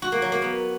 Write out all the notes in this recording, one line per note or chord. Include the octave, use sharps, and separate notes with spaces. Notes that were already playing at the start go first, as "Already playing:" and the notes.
F#4
A#3
F#3
A#3
B3